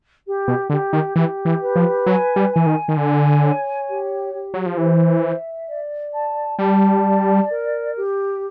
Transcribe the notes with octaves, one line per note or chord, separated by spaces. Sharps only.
G4
B2
D3 G4
D#3
E3 G4
E3
B4
F3
F#3 G#5
G3
G#5
E3
D#3
D#3
D3 G#5
C#5
G4
G4
F#3
F3
E3 C5
E5
D5
A5
G3 A5
D5
A#4
G4